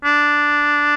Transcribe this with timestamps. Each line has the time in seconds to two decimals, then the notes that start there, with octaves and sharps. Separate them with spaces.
0.05 D4